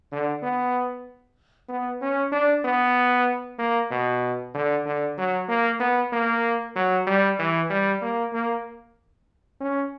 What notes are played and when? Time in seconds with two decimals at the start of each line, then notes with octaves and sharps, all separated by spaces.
0.12 D3
0.43 B3
1.69 B3
2.02 C#4
2.32 D4
2.65 B3
3.59 A#3
3.91 B2
4.54 D3
4.86 D3
5.18 F#3
5.48 A#3
5.80 B3
6.12 A#3
6.76 F#3
7.07 G3
7.39 E3
7.70 G3
8.02 A#3
8.33 A#3
9.61 C#4